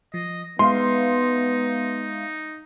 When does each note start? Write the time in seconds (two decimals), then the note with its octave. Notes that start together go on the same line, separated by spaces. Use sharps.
0.14 F3 D#5
0.59 G#3 B3 D#4 E5 F5 C6